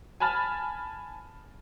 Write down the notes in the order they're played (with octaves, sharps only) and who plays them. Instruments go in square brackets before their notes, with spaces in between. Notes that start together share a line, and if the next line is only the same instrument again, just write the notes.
[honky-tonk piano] G#5 A5 B5 F6 A6